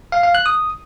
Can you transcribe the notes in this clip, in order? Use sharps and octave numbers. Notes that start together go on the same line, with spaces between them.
F5
F5
F#6
D#6